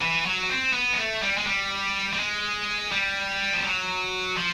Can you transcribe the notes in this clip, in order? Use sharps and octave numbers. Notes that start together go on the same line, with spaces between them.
E3
F#3
C4
B3
G#3
A3
G3
G#3
G3
G3
G#3
G3
F3
F#3
F3